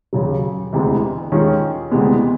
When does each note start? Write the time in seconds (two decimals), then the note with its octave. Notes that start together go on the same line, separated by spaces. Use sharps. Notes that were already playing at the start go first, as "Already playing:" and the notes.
0.13 D#2 C#3 F#3
0.73 E1 D2 C3 E3 G#3
1.32 D#2 D#3 G#3 C#4 F4
1.91 D2 C3 E3 G#3 B3